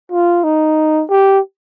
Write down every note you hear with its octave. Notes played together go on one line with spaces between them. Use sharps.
F4
D#4
G4